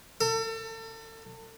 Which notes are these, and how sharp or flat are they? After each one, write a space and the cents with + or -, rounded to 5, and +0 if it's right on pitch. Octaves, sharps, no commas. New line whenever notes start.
A4 +35